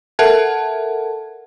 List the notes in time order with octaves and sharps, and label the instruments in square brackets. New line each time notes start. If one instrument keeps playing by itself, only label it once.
[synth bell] A4 A#4 E5 F#5 A5 G#6